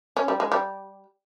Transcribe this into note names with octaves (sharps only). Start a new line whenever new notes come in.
C#4
G3
G#3
G3